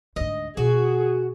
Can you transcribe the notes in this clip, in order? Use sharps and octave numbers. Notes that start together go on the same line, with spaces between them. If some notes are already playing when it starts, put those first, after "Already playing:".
D2 G#2 D#5
B2 F4 F#4 G#4